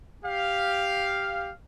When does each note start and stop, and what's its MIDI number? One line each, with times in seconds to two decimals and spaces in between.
0.25 1.50 67
0.25 1.50 77